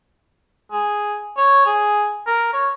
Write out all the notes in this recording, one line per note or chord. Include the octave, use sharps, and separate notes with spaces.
G#4
C#5
G#4
A#4
C#5